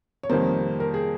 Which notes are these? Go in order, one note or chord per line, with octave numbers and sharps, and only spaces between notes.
C#5
F2 C3 D#3 G3 A#3 C5
A#4
G#4